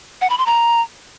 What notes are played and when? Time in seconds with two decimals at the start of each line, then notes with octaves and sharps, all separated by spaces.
0.21 F#5
0.30 B5
0.38 C6
0.46 A#5